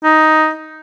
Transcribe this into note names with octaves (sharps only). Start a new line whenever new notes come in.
D#4